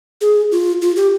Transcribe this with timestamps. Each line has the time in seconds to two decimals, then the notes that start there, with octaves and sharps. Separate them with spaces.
0.21 G#4
0.52 F4
0.82 F4
0.96 G4